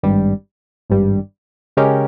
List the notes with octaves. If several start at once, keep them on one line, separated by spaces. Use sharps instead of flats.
G#1 G2 G3
G#1 G2 G3
C#3 G#3 C#4 G4 A#4